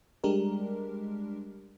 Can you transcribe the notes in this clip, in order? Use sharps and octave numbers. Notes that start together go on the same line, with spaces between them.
G3 G#3 D4 G4 A#4